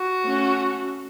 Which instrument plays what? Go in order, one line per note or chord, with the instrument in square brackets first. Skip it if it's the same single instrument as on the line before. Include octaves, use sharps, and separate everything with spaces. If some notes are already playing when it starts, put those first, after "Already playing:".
Already playing: [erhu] F#4
[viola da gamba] A3 C#4